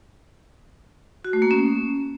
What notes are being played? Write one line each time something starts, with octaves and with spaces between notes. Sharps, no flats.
F#4
A3
A#3
C#4